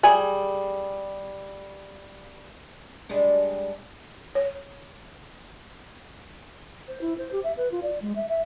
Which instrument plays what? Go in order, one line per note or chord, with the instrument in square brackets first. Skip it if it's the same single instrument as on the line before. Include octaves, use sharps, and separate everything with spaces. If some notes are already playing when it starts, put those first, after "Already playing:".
[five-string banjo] G3 G#4 G#5
[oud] G3 G#3 D4
[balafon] C#5
[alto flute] C5
E4
C5
G4
E5
B4
F4
D5
G#3
E5
E5